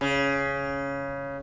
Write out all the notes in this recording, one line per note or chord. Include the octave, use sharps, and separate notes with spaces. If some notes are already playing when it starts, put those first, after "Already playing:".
C#3